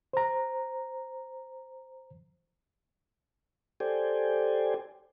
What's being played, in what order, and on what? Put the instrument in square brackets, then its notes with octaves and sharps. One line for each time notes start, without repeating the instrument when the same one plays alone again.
[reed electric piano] C5 A#5
[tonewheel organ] G4 A4 C5 D5 G5 G#5